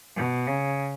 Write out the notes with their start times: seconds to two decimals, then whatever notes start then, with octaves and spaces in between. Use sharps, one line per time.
0.16 B2
0.47 C#3